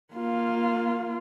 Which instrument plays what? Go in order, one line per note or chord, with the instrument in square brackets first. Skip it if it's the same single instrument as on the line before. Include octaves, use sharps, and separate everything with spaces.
[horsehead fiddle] A#3 F4